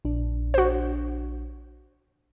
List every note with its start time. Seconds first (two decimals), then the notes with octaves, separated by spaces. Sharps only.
0.05 A#1 D4
0.54 F#4 C5